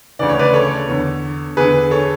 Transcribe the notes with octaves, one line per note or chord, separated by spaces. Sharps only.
D2 C#3 E3 D5
C#5
B4 D5
A4 C#5
E2 D3
E2 D3 G#4 B4
A4 C#5